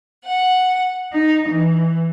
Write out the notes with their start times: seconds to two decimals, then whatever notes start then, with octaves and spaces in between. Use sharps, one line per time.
0.24 F#5
1.12 D#4
1.47 E3